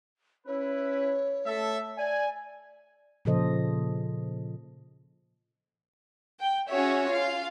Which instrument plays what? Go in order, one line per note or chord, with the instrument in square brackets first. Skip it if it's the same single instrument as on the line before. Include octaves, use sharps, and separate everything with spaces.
[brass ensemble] C#4 E4 B4 [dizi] C#5
[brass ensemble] A3 A4 E5
[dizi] D5 [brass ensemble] G#5
[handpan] A#2 C#3 F3 A4 C5 D#5
[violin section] G5
C#4 F#4 G#4 C#5 E5
F4 F5